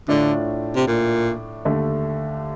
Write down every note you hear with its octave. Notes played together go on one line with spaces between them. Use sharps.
A2 D3 A3 D4 F4
C3
A#2
D#2 D3 A3